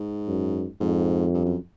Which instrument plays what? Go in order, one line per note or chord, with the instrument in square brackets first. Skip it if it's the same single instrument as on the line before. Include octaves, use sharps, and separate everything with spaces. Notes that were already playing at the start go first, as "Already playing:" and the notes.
Already playing: [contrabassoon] G#2
[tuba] F#2
[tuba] F2 [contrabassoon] G#2
[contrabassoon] G2
F#2